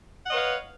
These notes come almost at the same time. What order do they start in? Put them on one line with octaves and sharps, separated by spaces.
F#5 D#5 C#5 B4 F5